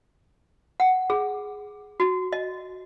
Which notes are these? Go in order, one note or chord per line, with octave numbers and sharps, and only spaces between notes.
F#5
G#4
F#4
D#5